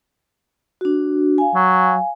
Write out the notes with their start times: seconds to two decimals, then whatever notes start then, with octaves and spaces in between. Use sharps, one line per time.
0.81 D4 F#4
1.38 F5 G#5
1.55 F#3